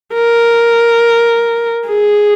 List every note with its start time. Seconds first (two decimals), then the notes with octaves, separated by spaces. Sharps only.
0.14 A#4
1.87 G#4